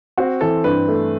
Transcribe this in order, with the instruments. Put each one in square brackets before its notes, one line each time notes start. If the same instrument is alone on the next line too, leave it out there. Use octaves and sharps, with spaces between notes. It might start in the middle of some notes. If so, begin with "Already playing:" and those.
[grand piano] C4 [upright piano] F#4
[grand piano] E3 [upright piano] A4
[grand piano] G2 [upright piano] B4
[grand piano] A3